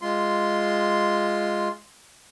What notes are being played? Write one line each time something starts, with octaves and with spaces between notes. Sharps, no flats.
G#3 F4 C6